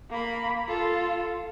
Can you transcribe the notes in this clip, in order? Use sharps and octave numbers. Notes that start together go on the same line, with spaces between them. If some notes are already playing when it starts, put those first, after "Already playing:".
A#3 B5
F4 A4